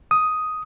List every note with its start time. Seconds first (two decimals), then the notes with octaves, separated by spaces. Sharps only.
0.11 D#6